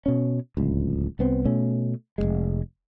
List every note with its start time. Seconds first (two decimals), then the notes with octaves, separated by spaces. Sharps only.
0.06 B2 C#4
0.57 D1 C#2
1.19 C2 B3 C4
1.45 B2 A3 C#4
2.18 F1 A#1 G#3